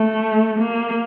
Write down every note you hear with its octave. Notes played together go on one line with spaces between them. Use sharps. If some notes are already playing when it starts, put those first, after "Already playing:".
Already playing: A3
A#3